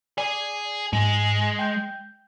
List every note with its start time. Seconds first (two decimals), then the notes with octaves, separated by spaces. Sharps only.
0.18 G#4 D5 G#5
0.93 G#2 G#3
1.59 G5 G6